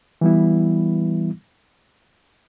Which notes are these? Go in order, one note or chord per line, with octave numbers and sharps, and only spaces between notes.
E3 G3 B3 E4